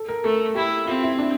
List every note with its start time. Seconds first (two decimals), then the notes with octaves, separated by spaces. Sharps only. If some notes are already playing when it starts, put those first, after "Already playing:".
Already playing: A4
0.08 A#4
0.24 A3 A4
0.55 E4 G4
0.87 C4 F4
1.03 E4
1.19 D4